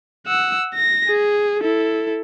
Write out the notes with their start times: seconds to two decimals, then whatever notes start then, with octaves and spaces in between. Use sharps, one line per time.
0.27 F#5 E6
0.75 A#6
1.08 G#4
1.60 E4 A4